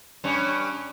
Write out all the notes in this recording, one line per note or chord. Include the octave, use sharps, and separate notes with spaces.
G2 C#4